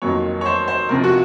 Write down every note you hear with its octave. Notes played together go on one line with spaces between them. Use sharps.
F1 F2 D#3 F#3 A#3 C#5
C#5
C5
C5
C#2 C3 F3 A#4
F#4